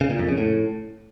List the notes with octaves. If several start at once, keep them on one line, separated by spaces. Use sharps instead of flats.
C#3
A#2
F2
C#3
A2